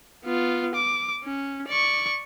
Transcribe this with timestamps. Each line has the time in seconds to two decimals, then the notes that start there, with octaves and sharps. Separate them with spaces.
0.25 B3 F4
0.75 D6
1.23 C#4
1.68 D5 C#6